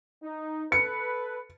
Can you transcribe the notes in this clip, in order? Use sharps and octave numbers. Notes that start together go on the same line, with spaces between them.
D#4
A4 B4 C#7